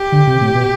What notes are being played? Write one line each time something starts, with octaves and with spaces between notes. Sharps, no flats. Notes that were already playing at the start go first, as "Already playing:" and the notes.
Already playing: G4
D3
C3
A2
B2